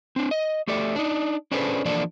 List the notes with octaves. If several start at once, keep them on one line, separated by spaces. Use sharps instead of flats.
C4 D4
D#5
A3 G4 A4 D5 E5
D4 D#4
C#4 D4 G#4 A4 B4 C5
E3 F3 A#3 D4 A4 D5